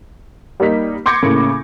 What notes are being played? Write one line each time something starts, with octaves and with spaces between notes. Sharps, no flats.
G3 A#3 D#4 B6
C6 D6 G6 G#6 A#6 C#7
A2 C#3 A#3